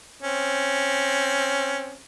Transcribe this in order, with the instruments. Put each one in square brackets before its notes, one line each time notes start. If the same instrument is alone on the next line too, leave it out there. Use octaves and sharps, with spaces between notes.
[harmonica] C4 C#4